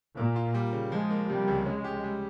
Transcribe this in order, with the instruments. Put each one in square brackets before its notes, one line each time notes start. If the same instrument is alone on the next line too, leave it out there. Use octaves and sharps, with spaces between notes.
[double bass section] A#2 [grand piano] A#3
[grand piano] F4
G3
C#3
[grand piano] F3 [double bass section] G#3
[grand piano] A#3
[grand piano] C3 [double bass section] G3
[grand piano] C#2
[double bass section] G#3 [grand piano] C#4
[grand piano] G4
G3